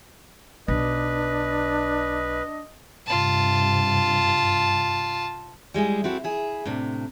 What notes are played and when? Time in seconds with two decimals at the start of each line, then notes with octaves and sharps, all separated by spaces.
0.68 B1 D4 B4 D#5
3.06 G2 C3 F4 A5
5.74 G3 G#3 E4 G#4
6.04 C4 E4 F#4 A4
6.24 E4 G#4 E5
6.65 A2 C3 D4